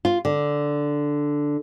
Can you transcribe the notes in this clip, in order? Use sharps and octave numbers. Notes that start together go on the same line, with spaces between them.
F4
D3